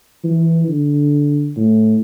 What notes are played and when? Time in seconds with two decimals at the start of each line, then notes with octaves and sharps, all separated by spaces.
0.24 E3
0.68 D3
1.57 A2